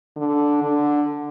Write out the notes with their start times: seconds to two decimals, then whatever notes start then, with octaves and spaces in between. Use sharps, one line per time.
0.17 D3
0.63 D3